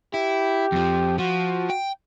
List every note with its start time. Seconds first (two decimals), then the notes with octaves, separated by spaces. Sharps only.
0.14 E4 G4
0.72 F2 F3
1.19 F3 F#4
1.70 G5